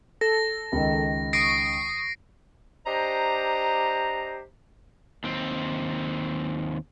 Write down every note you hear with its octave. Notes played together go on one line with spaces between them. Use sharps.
A4 A#6
C#2 D#3
C#6 D#6 A#6 C7 D7
D4 G4 C5 D#5 A#5
D#2 C4